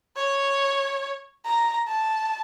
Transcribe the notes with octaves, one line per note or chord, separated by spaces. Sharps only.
C#5
A#5
A5